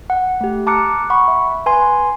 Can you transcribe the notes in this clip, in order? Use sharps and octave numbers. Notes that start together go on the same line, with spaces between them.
F#5
A3 G4
A5 A#5 D6 F6 F#6 C#7
F#5 B5 C#6
E5
B4 G#5 C6